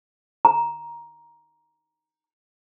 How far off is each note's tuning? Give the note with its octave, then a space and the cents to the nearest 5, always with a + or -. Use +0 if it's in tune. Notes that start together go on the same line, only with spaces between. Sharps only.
A#5 +10